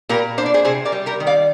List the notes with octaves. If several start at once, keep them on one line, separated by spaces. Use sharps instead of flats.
A#2 G4 A#4
D4 C5
D5
G#4 C5
C3 G#4 C5
A#4 D5
G3
G4 A#4
D#3
D5 F5